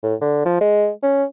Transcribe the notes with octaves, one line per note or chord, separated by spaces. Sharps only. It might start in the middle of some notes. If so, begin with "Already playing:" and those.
A2
D3
F3
G#3
C#4